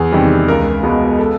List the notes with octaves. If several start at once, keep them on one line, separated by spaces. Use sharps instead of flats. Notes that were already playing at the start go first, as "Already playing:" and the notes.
Already playing: E2 G#4
C3 D#3 G3
C#2 A#4
B2 G#3 B3
A4